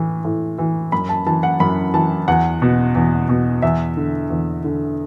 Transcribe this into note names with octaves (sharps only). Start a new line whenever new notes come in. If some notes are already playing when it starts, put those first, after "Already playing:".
Already playing: A2 E3
A2
E3
F#2 B5
A5
E3 A5
F#5
F#2 B5
E3 A5
E2 F#5
B2
E2
B2
E2 E5
D3
E2
D3